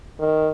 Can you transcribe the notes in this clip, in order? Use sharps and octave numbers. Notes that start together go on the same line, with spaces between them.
D#3